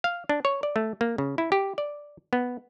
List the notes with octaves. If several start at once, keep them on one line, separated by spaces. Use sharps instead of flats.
F5
D4
C#5
D5
A3
A#3
C#3
E4
G4
D5
B3